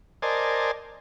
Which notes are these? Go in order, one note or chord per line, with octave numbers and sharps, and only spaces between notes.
A#4 C5 D5 D#5 G#5 A5